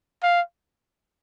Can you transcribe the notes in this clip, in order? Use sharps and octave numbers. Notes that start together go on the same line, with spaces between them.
F5